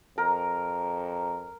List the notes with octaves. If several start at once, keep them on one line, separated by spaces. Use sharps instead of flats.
F2 A#4 A#5